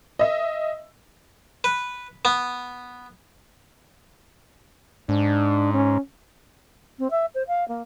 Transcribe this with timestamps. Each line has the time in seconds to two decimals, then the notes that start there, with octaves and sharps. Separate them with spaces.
0.19 D#5 E5
1.64 B4
2.25 B3
5.09 G#2 D4
5.74 C#4
6.99 C4
7.11 E5
7.34 C5
7.47 F5
7.68 A#3